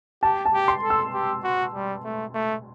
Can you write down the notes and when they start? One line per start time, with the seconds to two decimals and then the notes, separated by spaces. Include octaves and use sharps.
0.23 G4 A5
0.45 A5
0.53 G4
0.68 C6
0.83 A4
0.90 E6
1.13 G4
1.44 F#4
1.74 G3
2.04 A3
2.34 A3